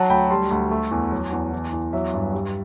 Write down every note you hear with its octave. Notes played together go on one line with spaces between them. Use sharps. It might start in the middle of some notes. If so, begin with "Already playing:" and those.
Already playing: F#3 F#5 A5
D2 G5 B5
G3 A5 C6
D2
A3
E2
F#3
E2
E3
E2
F#3 E5
G2
G3